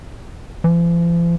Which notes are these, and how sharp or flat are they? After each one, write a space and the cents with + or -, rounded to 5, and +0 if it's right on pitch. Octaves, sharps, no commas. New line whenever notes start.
F3 -45